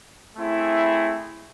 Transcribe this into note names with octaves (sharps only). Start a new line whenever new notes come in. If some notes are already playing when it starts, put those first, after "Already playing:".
A3 C4 E4 G#4